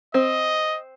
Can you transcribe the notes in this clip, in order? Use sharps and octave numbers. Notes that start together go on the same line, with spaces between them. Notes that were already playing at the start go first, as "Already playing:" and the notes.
C4 D#5